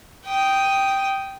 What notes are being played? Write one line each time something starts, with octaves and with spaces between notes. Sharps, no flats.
G5 D#6